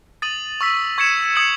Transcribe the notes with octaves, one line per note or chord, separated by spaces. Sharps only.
D#6 A6 D#7 F#7
C#6 E6 B6
C#6 G#6 C#7 E7
D#6 G#6 C#7 F#7